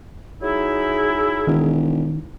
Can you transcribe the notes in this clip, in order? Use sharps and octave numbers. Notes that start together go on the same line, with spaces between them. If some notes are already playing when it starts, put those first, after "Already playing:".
F#3 D#4 E4 G#4
E1 D#3